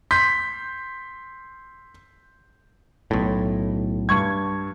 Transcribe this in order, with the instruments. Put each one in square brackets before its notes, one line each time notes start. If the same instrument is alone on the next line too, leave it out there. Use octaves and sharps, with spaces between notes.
[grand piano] C6 G6 B6
[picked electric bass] B1 A2
[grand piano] G2 C#6 G#6